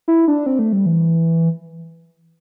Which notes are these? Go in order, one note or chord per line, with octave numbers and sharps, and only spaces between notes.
E4
D4
C4
A3
G3
E3